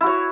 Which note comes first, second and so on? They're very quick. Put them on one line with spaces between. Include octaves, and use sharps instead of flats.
E4 F#4 C#5